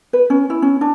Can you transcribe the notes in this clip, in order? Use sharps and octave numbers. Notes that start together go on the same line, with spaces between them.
B4
C#4
E4
C#4
D4